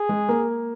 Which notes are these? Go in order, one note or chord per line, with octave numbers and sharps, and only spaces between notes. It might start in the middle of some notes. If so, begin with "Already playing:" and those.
Already playing: G#4
G#3
A#3